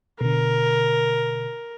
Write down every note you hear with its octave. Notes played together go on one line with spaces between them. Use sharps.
B2 D3 A#4